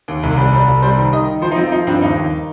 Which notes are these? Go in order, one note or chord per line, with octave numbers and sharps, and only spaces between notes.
D#2
C2
G3
G3
C2
G3 C5
D#3
D#3 D#5
D#3
F3 C5
D#4
F3 C4
F3 D#4
G2 C4
D#2 D#4
D#2